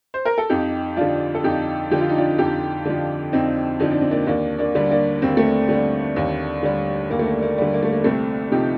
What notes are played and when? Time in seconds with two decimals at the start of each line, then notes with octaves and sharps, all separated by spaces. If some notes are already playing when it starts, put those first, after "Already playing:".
0.14 C5
0.25 A#4
0.38 A4
0.50 F2 D#4 G4
0.97 D3 F3 D4 F4
1.35 A4
1.44 F2 D#4 G4
1.91 D3 F3 G4
2.01 F4
2.09 D#4
2.17 D4 F4
2.38 F2 D#4 G4
2.85 D3 F3
3.33 F2 C4 D#4
3.80 D3 F3 D#4
3.91 D4
4.01 C4
4.11 A#3 D4
4.27 D#2 A#3 D4
4.58 A#3 D4
4.75 D3 G3
4.91 A#3 D4
5.22 D#2 C4
5.29 A#3
5.36 A3 C4
5.69 D3 G3
6.16 D#2
6.63 D3 G3
7.11 D#2 A#3
7.19 A3
7.26 A#3
7.42 A#3
7.58 D3 G3
7.74 A#3
7.83 A3
7.91 A#3
8.04 C2 A3 C4
8.51 C3 F3 D#4 G4